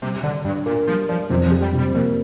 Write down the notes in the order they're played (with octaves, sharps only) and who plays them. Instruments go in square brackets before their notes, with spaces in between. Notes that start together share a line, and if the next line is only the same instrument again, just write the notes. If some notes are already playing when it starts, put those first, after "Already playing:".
[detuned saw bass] C3 [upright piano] G3
[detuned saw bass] D3 [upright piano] D5
[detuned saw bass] G2 [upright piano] D4
[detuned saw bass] A#2 [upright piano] A#4
[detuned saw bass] F3 [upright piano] G3
[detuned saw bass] F3 [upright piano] D5
[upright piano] F2 [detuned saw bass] C3
[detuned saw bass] F3
[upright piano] G4
[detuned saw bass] G3
[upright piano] C3
[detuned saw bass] G3
[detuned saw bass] F2 [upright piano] A#3